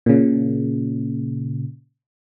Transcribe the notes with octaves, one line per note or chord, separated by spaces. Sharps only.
A#2 C#3